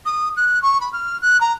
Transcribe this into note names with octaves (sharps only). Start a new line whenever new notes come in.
D#6
F#6
C#6
B5
F6
F#6
A#5